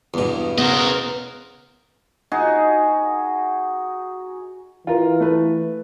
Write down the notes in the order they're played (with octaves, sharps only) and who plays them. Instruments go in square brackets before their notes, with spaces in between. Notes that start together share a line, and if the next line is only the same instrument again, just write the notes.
[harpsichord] E2 B2 [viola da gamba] G2
[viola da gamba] C#3 A#4 [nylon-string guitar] B3 [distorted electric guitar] C5 D#5
[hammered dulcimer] D#4 F#4 G#4
[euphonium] E3 [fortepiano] F4 A#4
[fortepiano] A3 B4